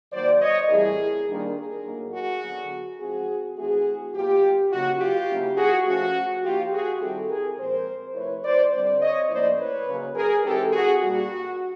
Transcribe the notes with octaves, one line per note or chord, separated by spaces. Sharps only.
D#3 F#3 A#3 C5 D5
C#5 D#5
A2 E3 G3 C4 E4 G#4 A#4
D#3 G3 A#3 D4 F4
G#4 A#4
A2 F#3 A#3 D#4
F#4 G#4
D3 F#3 B3
F3 G#3 C4 F#4 G#4
E3 A3 C4 E4 F#4 G#4
B2 F#3 A#3 F4 G4
C#3 F#3 A#3 D#4 F#4
F4 G4
C#3 F#3 A#3 C#4 E4
F#4 G#4
F3 A3 C#4 F#4
F3 A#3 D#4 F4 G4
F#4 G#4
D#3 G3 C4 E4 G4 A4
G#4 A#4
A#2 F3 G#3 C4 A#4 C5
C3 F3 A3 C4 E4 B4 C#5
C5 D5
D3 G3 C4 C5 D5
C#5 D#5
A2 F3 A#3 C#4 E4 C5 D5
B4 C#5
C#3 F#3 A#3
G#4 A#4
E3 G#3 C4 D#4 G4 A4
F#4 G#4
A#2 G3 A#3 D4 F#4